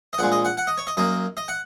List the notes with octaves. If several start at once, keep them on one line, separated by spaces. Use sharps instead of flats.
D#5
A#1 A#2 G#3 F#5
D#5
F#5
F#5
D#5
C#5
D#5
F#2 F#3 A#3 D#5
D#5
F#5